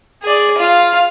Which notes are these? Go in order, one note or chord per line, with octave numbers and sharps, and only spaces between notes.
G#4 D5
F4 F5